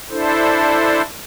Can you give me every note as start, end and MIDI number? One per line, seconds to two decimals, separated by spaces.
0.10 1.02 62
0.10 1.02 64
0.10 1.02 69
0.10 1.02 72